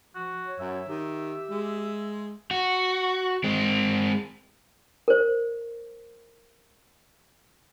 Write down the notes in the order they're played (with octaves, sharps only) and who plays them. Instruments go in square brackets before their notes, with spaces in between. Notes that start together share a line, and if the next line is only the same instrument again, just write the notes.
[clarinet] F3 [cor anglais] F#4
[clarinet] C#5
[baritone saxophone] F#2 [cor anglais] E5
[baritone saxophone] D#3 [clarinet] G4
[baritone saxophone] G#3
[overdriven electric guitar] F#4
G#3 C4
[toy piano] A#4 C5